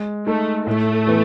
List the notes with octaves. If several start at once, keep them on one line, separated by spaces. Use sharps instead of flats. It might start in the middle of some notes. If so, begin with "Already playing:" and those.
Already playing: G#3
A3 D#4 A4
A2 A3
E3 B3